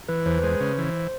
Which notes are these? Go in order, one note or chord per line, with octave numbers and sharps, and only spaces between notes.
E3 B4
E2 C5
B4
G#3 C5
C#3
E3